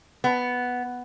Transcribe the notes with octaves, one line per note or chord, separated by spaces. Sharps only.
B3